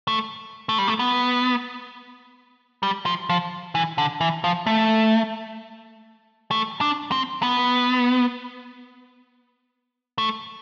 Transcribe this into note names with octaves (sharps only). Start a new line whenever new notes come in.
A3
A3
G3
A3
B3
G3
F3
F3
E3
D3
E3
F3
A3
A3
D4
C4
B3
A3